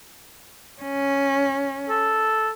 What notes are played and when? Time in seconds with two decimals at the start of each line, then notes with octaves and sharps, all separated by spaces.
0.82 C#4
1.89 A4